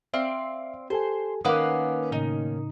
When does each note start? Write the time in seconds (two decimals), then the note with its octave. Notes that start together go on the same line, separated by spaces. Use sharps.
0.14 C4 D5 E5 F5
0.90 G4 A4 C5 G#5
1.45 D#3 A#3 C#4 B4 F5 F#5 D6 D#6
2.12 A2 C#3 D#4